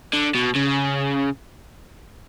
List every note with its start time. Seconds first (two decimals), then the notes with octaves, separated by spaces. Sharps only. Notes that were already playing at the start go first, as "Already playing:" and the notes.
0.13 D3
0.34 B2
0.55 C#3